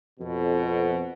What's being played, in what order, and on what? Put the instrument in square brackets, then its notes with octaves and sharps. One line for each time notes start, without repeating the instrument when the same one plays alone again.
[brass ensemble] F2 B2